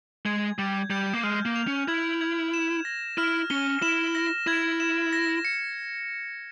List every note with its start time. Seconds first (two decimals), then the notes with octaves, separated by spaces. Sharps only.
0.26 G#3 G#6
0.59 G3 G6
0.90 G3 G6
1.13 A#3
1.23 G#3 F6
1.45 A#3
1.56 F7
1.67 C#4
1.88 E4 G#6
2.21 G#6
2.54 E7
2.85 A#6
3.18 E4 F6
3.50 C#4 G7
3.82 E4 E7
4.15 A#6
4.47 E4 G#6
4.80 E7
5.13 A#6
5.45 C#7